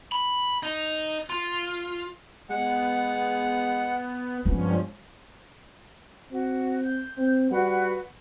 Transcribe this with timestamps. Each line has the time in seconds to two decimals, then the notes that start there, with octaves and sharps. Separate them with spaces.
0.12 B5
0.63 D#4
1.30 F4
2.50 G#3 B3 F#5
4.45 G2 F3 G#3 B3 C#4
6.31 C4 F#4
6.81 G6
7.17 C4
7.51 G3 F#4 B4 F#5